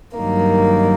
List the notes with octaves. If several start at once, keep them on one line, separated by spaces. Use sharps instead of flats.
G2 D#3 F#3 A#3